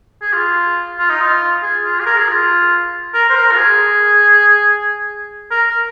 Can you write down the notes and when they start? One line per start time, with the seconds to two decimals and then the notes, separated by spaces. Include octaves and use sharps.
0.22 G#4
0.33 F4
0.98 F4
1.09 D#4
1.21 F4
1.63 G#4
1.84 F4
2.00 G#4
2.06 A#4
2.17 G#4
2.28 F4
3.14 A#4
3.29 C5
3.35 A#4
3.51 F4
3.57 G#4
5.51 A#4
5.68 A#4